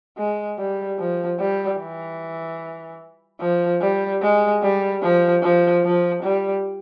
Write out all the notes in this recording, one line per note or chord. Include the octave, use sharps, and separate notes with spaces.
G#3
G3
F3
G3
E3
F3
G3
G#3
G3
F3
F3
F3
G3